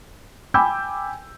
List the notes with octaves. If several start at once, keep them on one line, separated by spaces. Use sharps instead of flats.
G5 G#5 B5 D6 E6 G6